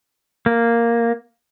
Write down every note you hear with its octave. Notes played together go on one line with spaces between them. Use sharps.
A#3